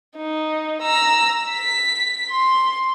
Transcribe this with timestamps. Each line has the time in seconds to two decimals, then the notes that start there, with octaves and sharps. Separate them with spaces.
0.17 D#4
0.82 A#5 E6
1.51 B6
2.31 C6